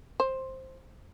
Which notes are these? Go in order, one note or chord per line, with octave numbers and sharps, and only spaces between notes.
C5